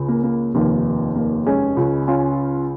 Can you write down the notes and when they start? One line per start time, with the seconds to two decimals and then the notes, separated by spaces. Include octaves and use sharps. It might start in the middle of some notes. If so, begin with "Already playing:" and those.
Already playing: C#2 C#3
0.09 A#3
0.23 A#3
0.54 F1 D#2 D#3 A#3
1.16 A#3
1.46 G#3 C#4
1.77 C#2 C#3
2.08 C#4 F4